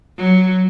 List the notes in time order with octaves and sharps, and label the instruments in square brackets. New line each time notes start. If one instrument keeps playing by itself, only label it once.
[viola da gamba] F#3